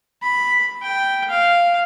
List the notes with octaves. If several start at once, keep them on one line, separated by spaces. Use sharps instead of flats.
B5
G5
F5